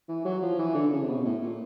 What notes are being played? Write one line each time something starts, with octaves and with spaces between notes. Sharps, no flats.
E3
F#3
F3
E3
D3
C#3
C3
B2
A2
A#2